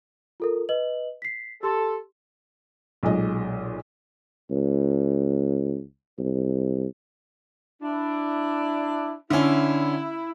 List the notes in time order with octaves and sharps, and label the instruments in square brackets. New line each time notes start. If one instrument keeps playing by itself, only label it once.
[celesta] F4 A4 A#4
B4 D#5 F#7
B6 C7
[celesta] G4 C6 [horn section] A4
[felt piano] B1 A#2 G#3 D#5
[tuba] C#2
C2
[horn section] D4 E4
[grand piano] D3 C#4 [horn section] E4